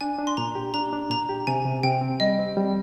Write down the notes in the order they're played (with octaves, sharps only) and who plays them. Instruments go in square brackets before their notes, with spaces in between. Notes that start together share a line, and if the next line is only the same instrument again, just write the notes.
[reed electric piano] D4 [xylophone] G#5
[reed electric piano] D4
[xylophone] C6
[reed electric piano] A#2 [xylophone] A#5
[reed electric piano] G4
[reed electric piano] D4 [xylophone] A#5
[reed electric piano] D4
[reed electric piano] A#2 [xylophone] A#5
[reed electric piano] G4
[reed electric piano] C3 [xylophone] G#5
[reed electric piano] C3
[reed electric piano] C3 [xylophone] G5
[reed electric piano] C4
[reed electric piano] G3 [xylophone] D#5
[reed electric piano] C4
G3